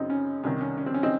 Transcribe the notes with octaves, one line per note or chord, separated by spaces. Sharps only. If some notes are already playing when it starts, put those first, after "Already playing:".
Already playing: F#2 C#3 C4 D#4
C#4
C2 C3 D#3 C#4
C#4
C#4
C4
C#4
C4 D#4